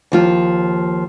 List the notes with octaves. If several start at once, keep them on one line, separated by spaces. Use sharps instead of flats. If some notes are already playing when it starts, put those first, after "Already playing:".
D#2 F3 F4